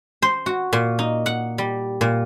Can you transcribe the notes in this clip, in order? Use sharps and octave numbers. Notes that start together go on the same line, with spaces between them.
C5
F#4
A#2
D#4
F#5
G3
A#2